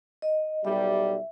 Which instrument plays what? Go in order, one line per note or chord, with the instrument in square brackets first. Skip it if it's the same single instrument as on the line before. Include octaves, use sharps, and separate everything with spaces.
[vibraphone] D#5
[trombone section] B1 G3 [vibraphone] E5